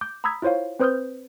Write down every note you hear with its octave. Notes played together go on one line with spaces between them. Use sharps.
D6 G6
A#5 B5 D#6 E6 G#6 B6
E4 F4 C5 C#5 F5
C4 B4 C5 D#6 F6 G6